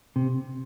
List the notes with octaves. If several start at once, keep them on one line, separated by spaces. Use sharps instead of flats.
C3